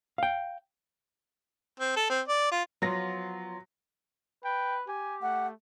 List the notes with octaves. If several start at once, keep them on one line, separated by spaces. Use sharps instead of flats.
F5 G5
C4
A4
C4
D5
F4
F3 F#3 B3 F4 A#6
B4 G5
G4 G#5
A3 F#5